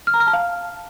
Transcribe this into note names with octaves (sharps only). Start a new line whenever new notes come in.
F6
A#5
F6
A5
F5